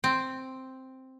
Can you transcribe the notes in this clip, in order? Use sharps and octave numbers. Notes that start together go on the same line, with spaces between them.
C4